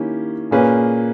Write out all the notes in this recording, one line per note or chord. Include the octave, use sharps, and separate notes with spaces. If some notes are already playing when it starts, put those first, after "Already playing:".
Already playing: D#3 A#3 C#4 E4 G4
A#2 A#3 C#4 G#4 B4